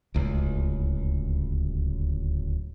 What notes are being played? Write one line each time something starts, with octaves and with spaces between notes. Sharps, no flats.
D1 C#2